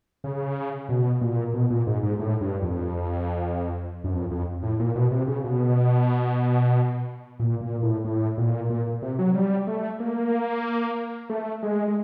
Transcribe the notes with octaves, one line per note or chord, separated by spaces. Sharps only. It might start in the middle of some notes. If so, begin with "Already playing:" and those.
C#3
B2
A#2
B2
A#2
G#2
G#2
A2
G2
F2
F#2
F2
F2
A2
A#2
B2
C3
C#3
B2
A#2
A#2
A2
A2
A#2
A#2
C3
F#3
G3
A3
A#3
A3
G#3
G#3